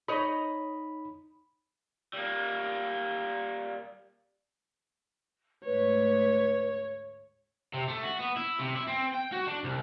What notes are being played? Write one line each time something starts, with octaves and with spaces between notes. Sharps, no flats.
D#4 C#5 D#5 B5
G3 A#3
D2 G#2 B4 C#5
C3
A3
F#4
B3
E4
C3
E4
C4
G5
F#4
D4
C2